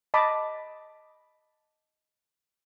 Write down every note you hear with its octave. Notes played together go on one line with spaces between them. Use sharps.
D#5 A5 B5 D6